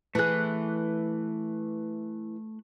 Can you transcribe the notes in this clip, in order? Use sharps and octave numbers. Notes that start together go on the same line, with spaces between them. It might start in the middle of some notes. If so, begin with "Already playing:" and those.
E3 A3 G#4 F#6